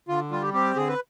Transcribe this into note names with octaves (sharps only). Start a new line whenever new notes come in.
D3 F4
G3 F4
G4
C4 G4
D3 G#4
B4